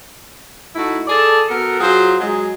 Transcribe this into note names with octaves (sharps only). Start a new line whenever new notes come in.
A3 D#4 E4 F#4
G#4 A4 D5 A5
B3 F#4 A4 A#4
F#3 F4 G#4 C5
F#3 G#3 G#4